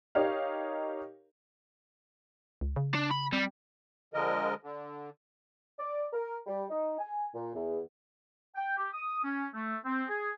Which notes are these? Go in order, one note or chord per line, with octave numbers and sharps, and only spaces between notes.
D#4 G4 A#4 C#5 F5
C#2
C#3
D4
B5
G3 C4
D3 F3 G#3 A#4 D#5
D3
D5
A#4
G3
D#4
G#5
A#2
E2
G5
G4
D#6
C#4
A3
C4
G#4